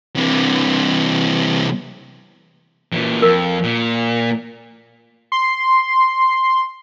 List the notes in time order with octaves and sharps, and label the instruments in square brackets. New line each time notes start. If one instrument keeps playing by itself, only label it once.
[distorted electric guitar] C3 E3
A#2 E3
[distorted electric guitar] F2 [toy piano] A#4
[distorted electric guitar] A#2
[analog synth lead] C6